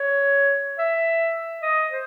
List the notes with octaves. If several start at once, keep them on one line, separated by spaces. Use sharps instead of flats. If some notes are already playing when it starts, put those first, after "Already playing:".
Already playing: C#5
E5
D#5
C5